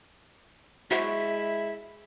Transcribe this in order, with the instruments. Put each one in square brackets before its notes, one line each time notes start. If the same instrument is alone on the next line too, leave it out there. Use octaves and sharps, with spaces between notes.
[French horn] G#3 [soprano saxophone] E4 [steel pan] F#4 G#4 C5 [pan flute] E5